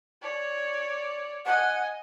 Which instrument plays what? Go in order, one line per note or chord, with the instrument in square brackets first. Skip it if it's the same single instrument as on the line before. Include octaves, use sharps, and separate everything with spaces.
[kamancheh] C#5 D5
[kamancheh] D#5 G#5 [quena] F#5